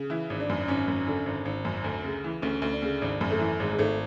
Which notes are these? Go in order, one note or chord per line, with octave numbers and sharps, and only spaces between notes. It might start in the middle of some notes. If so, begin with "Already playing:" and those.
Already playing: C#3
E3 E4
G#1
D4
F#2
D4
G#1 C#4
F#2
D3
G#1
G#1
F#2
D2
C#3
E3
D2 C#4
D2
D4
C#3
G#1 D4
F#2
A3
E3
G#1 G#3
G#3
G#1 A3